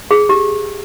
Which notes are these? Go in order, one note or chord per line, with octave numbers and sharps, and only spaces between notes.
G#4
G4